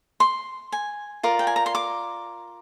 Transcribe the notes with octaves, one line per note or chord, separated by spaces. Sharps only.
C6
G#5
F4 A#4 D5
G5
G#5
A#5
C6
D6